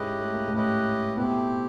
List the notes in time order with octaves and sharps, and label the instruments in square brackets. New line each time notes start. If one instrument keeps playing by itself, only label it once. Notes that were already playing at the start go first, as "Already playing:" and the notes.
Already playing: [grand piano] G#2 G#3 [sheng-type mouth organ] C#4 E4 G4 B4 D#5
[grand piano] A3
A#3
A2 A3
[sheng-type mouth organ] C#4 E4 G4 B4 D#5
[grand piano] B2 B3 [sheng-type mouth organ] A3 C4 E4 G4